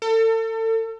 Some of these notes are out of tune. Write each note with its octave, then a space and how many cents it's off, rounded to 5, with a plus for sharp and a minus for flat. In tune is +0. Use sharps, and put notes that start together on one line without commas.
A4 +35